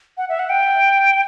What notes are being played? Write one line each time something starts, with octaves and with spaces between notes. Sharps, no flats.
F#5
E5
F#5
G5